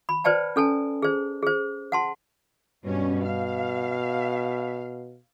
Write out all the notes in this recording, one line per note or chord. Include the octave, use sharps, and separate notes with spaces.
B5
B4 C5 D5 G5 A5
C#4 A4 G#5 A5
G#4 C5
G#4 C5
F#5 A5 C6
G2 B2 G3 C#4
F5